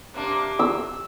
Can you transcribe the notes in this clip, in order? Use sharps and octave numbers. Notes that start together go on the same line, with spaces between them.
C3 A#3 D4
E6